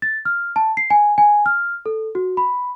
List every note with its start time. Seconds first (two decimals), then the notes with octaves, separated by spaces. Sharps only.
0.02 A6
0.25 F6
0.56 A5
0.77 C7
0.90 G#5
1.18 G#5
1.46 F6
1.86 A4
2.15 F#4
2.37 B5